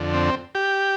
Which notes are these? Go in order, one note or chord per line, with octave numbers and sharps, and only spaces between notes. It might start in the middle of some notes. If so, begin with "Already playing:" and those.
Already playing: F2 D3
C4
G4